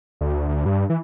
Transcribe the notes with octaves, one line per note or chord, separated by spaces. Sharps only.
D2
D2
G2
E3